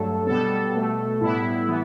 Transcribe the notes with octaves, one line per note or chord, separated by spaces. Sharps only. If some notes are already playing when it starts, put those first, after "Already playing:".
Already playing: G2 F#3 A3 A4
B2 G3 B3 A4
B2 A3
A2 G3 B3 E4
E3 B3